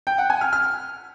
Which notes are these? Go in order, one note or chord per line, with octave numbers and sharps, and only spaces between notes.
G5
F#5
G#5
F6
F6